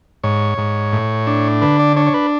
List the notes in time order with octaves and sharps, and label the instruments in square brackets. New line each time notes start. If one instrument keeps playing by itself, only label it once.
[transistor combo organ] G#2 C#5
G#2
A2
D4
D3 B4
D5
D4 C#5
C#5
B4